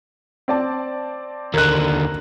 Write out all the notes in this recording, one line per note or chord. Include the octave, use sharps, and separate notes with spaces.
C4 D5 A5
D#2 D3 A#4 F#6